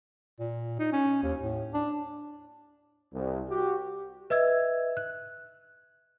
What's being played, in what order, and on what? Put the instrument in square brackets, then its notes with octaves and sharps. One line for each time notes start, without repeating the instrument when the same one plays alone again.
[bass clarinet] A#2
D#4
C#4
D#2
A2
D4
[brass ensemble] C2
F#4 G4
[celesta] B4 D#5 E5 E6 G#6
F#6